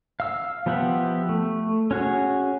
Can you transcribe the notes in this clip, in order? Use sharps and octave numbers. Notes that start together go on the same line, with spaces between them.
F5 E6
F3 B3 G4 E5 F#5
A3
C#4 F#4 G#4